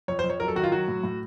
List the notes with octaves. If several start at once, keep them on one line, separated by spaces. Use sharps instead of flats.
F2 C#5
C5
F2
C#5
F#3 A#4
A4
D#3 F#4
F4
F#3 F#4
A2
A2